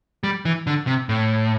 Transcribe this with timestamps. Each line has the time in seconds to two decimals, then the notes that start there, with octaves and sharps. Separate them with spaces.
0.24 G3
0.45 E3
0.67 D3
0.87 C3
1.09 A2